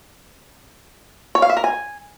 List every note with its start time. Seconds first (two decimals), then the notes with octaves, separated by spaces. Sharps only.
1.35 C#5
1.42 F5
1.49 E5
1.57 A#4
1.64 G#5